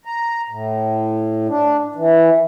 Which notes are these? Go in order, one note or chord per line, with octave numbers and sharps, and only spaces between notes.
A#5
A2
D4
E3